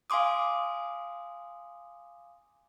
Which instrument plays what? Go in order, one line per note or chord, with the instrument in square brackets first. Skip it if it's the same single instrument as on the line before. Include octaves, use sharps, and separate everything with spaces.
[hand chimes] F5 G#5 C6 D6 D#6